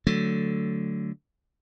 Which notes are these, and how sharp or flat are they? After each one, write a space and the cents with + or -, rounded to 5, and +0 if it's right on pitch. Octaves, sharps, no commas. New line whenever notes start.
D3 +0 F#3 +0 A3 +0